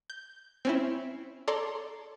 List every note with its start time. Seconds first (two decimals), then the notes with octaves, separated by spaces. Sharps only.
0.10 G6
0.65 C4 C#4 E4
1.48 A4 C#5 D5 A#5 C6